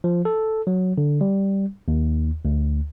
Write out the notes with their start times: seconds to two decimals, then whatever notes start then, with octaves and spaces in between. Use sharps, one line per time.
0.04 F3
0.25 A4
0.67 F#3
0.98 D3
1.21 G3
1.88 D#2
2.45 D2